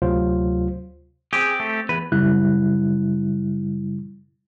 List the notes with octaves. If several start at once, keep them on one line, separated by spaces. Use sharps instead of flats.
D2 C3 F#3 F4 C5
C4 G4 G#4
A3
E2 B4
F#2 C#3 G3 E4 F#6